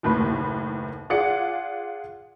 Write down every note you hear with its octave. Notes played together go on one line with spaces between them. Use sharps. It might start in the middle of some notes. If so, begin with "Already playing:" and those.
F#1 D#2 A2 B4
F4 G#4 D5 F#5 C#7